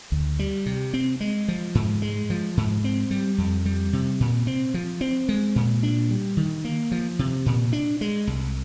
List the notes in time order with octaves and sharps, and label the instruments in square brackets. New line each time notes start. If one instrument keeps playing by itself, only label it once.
[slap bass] D2
G3
C3
C4
G#3
F3
G#2
G#3
F3
G#2
C4
G3
F2
G3
C3
A#2
C4
F3
C4
G#3
A#2
D4
G3
D#3
A#3
F3
C3
A#2
D4
G#3
C2